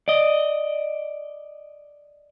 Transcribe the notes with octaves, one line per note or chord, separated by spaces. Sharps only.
D5 D#5